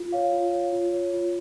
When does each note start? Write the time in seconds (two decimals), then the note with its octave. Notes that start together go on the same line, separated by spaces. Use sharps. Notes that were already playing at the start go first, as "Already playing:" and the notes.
Already playing: F4
0.12 C#5 F5
0.32 F4
0.53 C#5
0.72 F4
0.92 C#5
1.13 F4